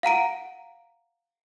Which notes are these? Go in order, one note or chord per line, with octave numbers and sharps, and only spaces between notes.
F5 F#5 A#5 D7